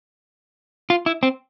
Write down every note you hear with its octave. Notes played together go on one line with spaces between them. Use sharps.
F4
E4
C4